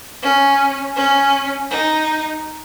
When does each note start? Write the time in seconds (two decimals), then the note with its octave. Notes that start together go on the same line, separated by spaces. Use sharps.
0.23 C#4
0.96 C#4
1.71 D#4